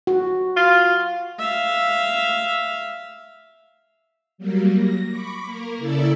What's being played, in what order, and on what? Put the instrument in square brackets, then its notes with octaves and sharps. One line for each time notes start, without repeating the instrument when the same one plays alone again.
[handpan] F#4
[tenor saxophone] F4
[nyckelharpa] E5 F5
[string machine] F#3 G3 A#3
A#6
B5 C#6 D6
A#3 A#4
C#3 E4 A4 D5 E6